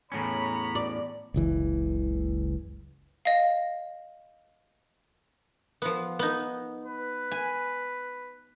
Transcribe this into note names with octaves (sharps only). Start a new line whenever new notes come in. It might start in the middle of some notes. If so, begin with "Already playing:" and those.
E2 A2 C#4 C#5 A#5 B5
D5
F#1 C#2 E3
D#5 F5
F3 B3
B3 D#4
B4
G#5